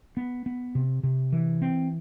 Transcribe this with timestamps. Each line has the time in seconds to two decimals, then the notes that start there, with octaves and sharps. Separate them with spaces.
0.17 B3
0.46 B3
0.75 C3
1.03 C3
1.32 E3
1.62 C4